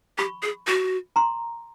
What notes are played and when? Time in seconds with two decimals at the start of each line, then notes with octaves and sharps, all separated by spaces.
0.18 G4 B5 C#6
0.43 G#4
0.67 F#4
1.16 A#5 C6